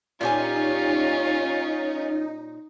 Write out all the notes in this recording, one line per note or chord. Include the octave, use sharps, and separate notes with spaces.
A#2 C#4 D#4 F4 G4 G#5